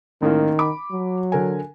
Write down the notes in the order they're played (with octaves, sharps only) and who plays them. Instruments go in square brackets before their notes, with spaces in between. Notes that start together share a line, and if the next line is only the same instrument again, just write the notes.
[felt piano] A1 A#3 [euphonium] D#3
[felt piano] B5 D6
[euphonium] F#3
[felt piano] D3 A#4 G#5